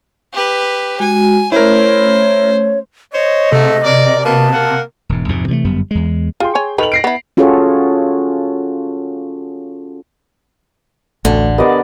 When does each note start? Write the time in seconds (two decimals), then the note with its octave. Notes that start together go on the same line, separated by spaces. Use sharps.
0.33 G4 B4
1.00 G#3 F#4 G#5
1.52 A3 C#4 E4 A#4 C5 C#5
3.13 C5 C#5 D#5
3.52 G#2 C3 A3
3.84 A#4 D5
4.24 B2 A#3 B3 A5
4.52 A#3 A#4 F#5
5.09 E1 G#2
5.28 A#1 F2 G#2 C3
5.48 C3 E3 F#3 A3
5.64 G1 F#2 G3 B3
5.91 E2 G#3
6.40 F4 G#4 G5 C6
6.55 C#5 G#5
6.78 D#3 A4 B4 F7 F#7
6.92 A#6 C7 D7
7.04 B3 E4
7.37 C#4 F4 F#4 G#4 A4 C#5
11.25 A1 D2 D3
11.58 B3 G4 A#4 D5 D#5